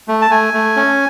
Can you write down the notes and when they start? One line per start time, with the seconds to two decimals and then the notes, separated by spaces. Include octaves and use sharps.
0.08 A3
0.22 A5
0.30 A3 G#5
0.54 A3
0.76 C#4